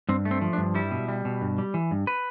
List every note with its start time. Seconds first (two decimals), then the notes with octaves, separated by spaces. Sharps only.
0.09 G2 C4
0.25 A3
0.31 C4
0.42 F3
0.53 D4
0.58 G2
0.75 G3 E4
0.91 B2
1.08 G3
1.25 B2
1.42 G2
1.58 G3
1.74 E3
1.91 G2
2.07 B4